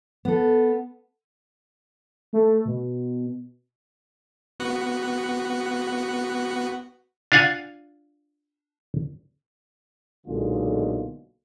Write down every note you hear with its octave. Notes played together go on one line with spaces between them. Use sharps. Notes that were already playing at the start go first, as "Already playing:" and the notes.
B3 A4
A3
B2
B3 F#4 F#5
D4 F4 F5 F#5 G#5
B1 A#2 D3 G#3 F4